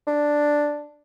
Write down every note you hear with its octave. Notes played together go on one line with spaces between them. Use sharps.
D4